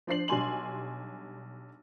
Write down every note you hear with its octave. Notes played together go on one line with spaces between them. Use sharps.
F3 D4 C5 C7 F#7
B1 G3 D4 G#5 C6 F#7